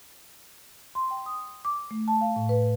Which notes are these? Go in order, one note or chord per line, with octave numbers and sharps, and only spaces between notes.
C6
G5
D#6
D6
A3
A5
F5
A2
B4